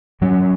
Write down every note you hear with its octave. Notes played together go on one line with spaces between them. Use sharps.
G#2 F#3 C#4